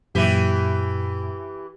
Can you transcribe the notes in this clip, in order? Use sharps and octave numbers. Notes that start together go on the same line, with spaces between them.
F#2 A#2 E3 G4